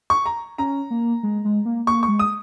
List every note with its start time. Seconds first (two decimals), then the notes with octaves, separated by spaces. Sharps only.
0.10 C#6
0.26 A#5
0.58 C#4 A#5
0.90 A#3
1.23 G#3
1.45 G#3
1.65 A#3
1.87 A#3 C#6
2.03 C#6
2.08 G#3
2.19 D#6